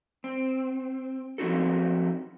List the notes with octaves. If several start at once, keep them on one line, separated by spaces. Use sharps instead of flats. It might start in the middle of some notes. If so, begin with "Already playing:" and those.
C4
F3 C4 D#4 F#4 A4